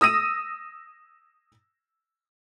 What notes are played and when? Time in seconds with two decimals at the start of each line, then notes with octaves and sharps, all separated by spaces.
0.01 D#6 E6 A#6 D#7